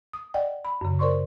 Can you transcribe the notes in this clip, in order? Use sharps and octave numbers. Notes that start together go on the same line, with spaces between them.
D#6
D5 D#5 F#5 G5
B5
F#2 C#3
A#4 C5 D5 C6 C#6